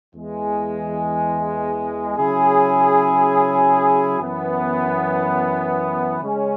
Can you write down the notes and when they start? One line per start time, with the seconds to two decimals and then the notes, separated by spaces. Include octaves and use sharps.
0.14 E2 E3 G#3
2.17 C#3 F#3 E4 G#4
4.19 F#2 E3 B3
6.22 C#3 G#3 C#4